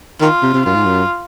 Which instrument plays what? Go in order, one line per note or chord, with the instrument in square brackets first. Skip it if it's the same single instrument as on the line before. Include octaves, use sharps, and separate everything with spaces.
[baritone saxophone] D#3 [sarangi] F4
[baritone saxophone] C3
C3
[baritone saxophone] F#2 [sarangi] F4
[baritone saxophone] G#2
F#2